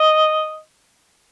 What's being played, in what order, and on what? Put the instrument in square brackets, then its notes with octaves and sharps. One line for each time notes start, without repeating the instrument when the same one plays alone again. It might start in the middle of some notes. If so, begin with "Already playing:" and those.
Already playing: [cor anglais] D#5